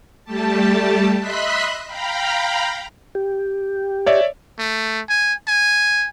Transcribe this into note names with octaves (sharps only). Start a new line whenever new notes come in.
G3 A3 G4 A5
D#5 E5 B5 C6 F#6 B6
F5 G5 A#5 B5
G4
C#5 D5 E5
A3
G#5
G#5